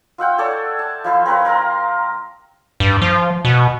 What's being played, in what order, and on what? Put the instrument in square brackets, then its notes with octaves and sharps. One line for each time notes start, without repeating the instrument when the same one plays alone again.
[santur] F4 E5 F#5 G5
A4 C#5 D5 A5
A5
F3 E4 C5 F5
C4 A#4 B4 C#5
A#4 F5 A#5 C6
[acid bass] G2
F3
B2